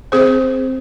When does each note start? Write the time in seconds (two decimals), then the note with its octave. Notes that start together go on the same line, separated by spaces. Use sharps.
0.12 C4 G#4 C5